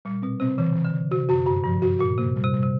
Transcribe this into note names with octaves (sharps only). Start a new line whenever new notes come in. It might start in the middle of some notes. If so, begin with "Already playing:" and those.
A#2 G3
B2 C4
C3 C4
C#3 E3
E3
D3
E3
C3 F#4
F#2 F#4
G2 F#4
G2 F3
F#4
A#2 F#4
C3 A#3
G3
C3
G3
C3